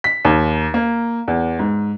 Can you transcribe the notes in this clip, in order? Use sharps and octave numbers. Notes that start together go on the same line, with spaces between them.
B6
D#2
A#3
E2
G#2